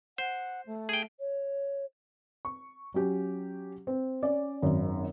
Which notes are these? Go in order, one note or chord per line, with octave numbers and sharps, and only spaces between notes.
C5 F#5
A3
G#4 G5
C#5
C#6
F#3 C#4 G4
C4
C#4 D5
G#1 F#2